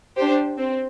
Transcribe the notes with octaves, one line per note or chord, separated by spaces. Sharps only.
D4 G4 C5
C4